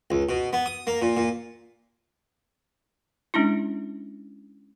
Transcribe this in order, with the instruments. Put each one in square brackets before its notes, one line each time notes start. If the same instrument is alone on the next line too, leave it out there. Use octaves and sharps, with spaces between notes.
[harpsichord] C#2
B2
B3
D#6
A#3
A#2
A#2
[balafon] G#3 C#4 D4 E4